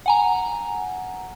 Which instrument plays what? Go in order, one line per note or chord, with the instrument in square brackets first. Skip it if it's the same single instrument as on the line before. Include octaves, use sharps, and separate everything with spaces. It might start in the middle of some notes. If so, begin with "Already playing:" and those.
[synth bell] F#5 G#5 A#5